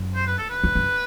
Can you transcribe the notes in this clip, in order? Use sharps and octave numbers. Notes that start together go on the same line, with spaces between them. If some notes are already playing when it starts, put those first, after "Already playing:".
Already playing: F#2
C5
B4
A4
B4
E2
F#2